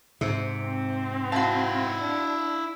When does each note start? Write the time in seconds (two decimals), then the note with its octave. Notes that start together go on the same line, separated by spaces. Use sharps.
0.21 G#2 C3 E5
0.63 C4
1.32 E4 F#4 F5 A5
1.98 D4